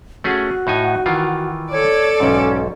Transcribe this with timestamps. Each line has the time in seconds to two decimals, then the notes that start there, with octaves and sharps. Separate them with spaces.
0.24 A3 C#4 F#4 G#4
0.67 A2 D#4 G#5
1.06 D#3 E3 F4
1.72 A4 C#5 D5
2.20 B1 G#2 C#4